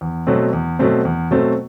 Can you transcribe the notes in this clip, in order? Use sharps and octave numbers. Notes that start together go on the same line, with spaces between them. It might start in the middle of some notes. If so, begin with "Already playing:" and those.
E2
B2 F#3 A3 C4
E2
B2 F#3 A3 C4
E2
B2 F#3 A3 C4